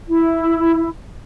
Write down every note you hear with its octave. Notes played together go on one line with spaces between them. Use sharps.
E4